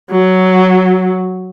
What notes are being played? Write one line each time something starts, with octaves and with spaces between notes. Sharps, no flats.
F#3